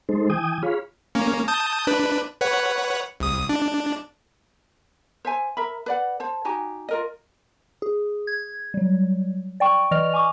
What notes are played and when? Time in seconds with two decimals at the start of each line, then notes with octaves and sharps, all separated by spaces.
0.09 G#3 D#4 A4 C5
0.30 E3 G5 G#5 D#6
0.63 F4 G#4 C#5 F5 B5
1.15 A#3 C#4
1.48 A5 D#6 G6
1.87 D4 B4
2.41 B4 C#5 F#5
3.20 C2 D#6
3.49 D4
5.25 C5 E5 G#5
5.57 A#4 E5 B5
5.86 B4 D5 F#5
6.20 C5 A5
6.45 D#4 F#4 G4 G#5
6.89 F4 A#4 D#5
7.82 G#4
8.27 G#6
8.74 F#3 G3
9.60 D5 G5 C#6
9.91 E3 D5 D#5 F6 F7
10.14 G#5 C#6 D6